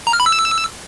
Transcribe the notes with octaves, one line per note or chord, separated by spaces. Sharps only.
A#5
F6
B5
E6